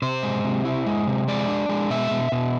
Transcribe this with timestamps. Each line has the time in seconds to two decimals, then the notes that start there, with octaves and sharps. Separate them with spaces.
0.02 C3 C5
0.23 G#3
0.44 C3
0.65 E4
0.86 G#3
1.07 C3
1.28 G#3 D5
1.48 D4
1.69 G#3
1.90 B2 E5
2.11 B2
2.32 B2